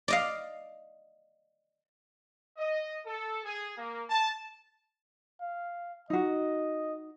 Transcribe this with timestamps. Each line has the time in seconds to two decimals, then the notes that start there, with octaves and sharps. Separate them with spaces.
0.08 D5 D#5 F5
2.57 D#5
3.06 A4
3.44 G#4
3.77 A#3
4.10 A5
5.41 F5
6.10 D#4 F#4 D#5